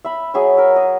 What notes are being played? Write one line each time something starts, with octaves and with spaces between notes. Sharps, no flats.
E5 B5
F#3 G#4 C#5 E5
A#4 E5
D#5